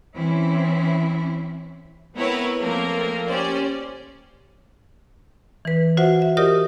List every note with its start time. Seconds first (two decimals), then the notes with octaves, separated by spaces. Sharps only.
0.16 E3 C4 C#4 E4
2.16 B3 C4 E4 A#4 B4 C#5
2.60 F3 A3 A#3 C4 A#4
3.26 C#4 G4 C5 D5
5.65 E3 B4
5.97 F4 F#4 C5 E5 F#5
6.22 E5
6.37 F4 G4 A#4 D5 D#5 D#6